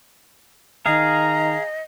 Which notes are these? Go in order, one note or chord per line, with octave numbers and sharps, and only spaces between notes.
D#3 G#4 D#5 F5 A#5